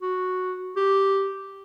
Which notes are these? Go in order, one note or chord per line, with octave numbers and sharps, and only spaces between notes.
F#4
G4